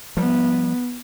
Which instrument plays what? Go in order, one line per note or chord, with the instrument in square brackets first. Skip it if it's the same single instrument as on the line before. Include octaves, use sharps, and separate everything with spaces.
[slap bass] F3 G3 [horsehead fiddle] B3